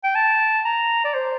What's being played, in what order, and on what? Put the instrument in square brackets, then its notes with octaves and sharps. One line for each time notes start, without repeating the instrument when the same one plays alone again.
[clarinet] G5
A5
A#5
D5
C5